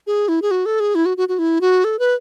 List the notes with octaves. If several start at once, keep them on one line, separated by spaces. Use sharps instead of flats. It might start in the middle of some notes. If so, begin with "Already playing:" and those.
G#4
E4
G#4
F#4
A4
G#4
E4
F#4
F#4
F#4
E4
F#4
A4
B4